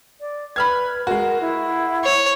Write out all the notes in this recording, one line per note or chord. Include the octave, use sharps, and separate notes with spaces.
D5
B4 B5 F6 G#6
G#3 F#4 A#4
E4
C#5